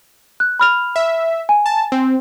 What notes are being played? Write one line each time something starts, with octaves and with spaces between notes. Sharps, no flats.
F#6
B5 F6 F7
E5
G#5
A5
C4